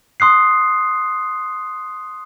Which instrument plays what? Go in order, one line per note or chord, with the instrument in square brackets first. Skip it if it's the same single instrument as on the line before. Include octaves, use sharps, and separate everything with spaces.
[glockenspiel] C6 D#6 F#6 C7